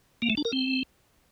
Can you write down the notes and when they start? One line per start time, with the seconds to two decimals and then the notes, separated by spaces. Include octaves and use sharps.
0.22 A#3
0.30 A3
0.37 D4
0.45 A#4
0.53 C4